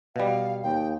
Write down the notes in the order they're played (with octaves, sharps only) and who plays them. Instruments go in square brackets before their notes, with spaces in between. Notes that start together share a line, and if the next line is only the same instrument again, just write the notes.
[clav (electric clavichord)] B2 G3 [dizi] F5
[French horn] D#2 [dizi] G5